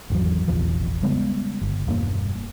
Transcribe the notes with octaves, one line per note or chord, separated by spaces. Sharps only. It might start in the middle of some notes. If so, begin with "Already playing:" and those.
G#1 E2 F#3
F1 A#1 E2 F3
C#3 G3 G#3 B3
G1
E1 G2 A#3